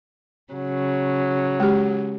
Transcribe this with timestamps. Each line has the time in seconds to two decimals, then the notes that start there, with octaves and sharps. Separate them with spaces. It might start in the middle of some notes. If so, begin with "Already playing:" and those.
0.52 C#3 F#3
1.60 G#3 G4